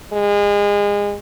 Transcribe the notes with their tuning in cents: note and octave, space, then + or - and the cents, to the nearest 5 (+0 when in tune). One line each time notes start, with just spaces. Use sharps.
G#3 -30